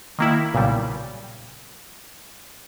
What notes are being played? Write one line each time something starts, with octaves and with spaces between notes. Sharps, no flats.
D#3 A#3 E4
B1 A#2 C#3 F#3 G3